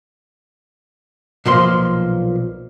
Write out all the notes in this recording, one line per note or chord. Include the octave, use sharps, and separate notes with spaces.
B1 A#2 F3 C6